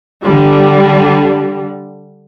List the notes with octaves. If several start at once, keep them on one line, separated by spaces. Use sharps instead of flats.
D3 G3